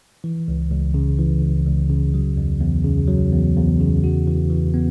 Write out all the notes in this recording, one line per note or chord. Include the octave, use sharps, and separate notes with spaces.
E3
C#2
C#2
C#3
E3
C#2
C#2
C#3
F#3
E2
E2
C#3
F#3
E2
E2
C#3
F#4
E3
E3
B3